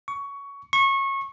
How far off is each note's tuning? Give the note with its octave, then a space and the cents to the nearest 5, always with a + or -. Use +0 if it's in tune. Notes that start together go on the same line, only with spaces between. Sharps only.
C#6 +15
C#6 -25